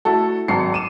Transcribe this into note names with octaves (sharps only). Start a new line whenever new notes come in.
A3 E4 F#4 A4
G#1 F#3 A5 A#5 C7 C#7
D6 D#7 E7